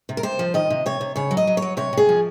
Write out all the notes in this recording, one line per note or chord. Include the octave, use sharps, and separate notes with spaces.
C3
A#4
C3 C5
F3
D#3 D#5
C3
C3 C#5
C3
C#3 C#5
F#3
D#5
F#3
C#5
F#3
C3 C#5
C3 G#4
F3